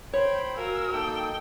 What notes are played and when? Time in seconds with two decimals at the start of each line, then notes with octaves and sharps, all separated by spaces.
0.13 C5 C#5 G5 B5
0.57 F#4 A#4 F5 G#5 E6
0.93 A#3 D#4 A4 G5